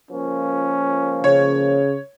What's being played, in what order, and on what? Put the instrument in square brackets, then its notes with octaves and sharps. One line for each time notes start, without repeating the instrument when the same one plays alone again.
[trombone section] C#2 F3 A#3 [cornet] C#4
[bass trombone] C#3 [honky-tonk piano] C#5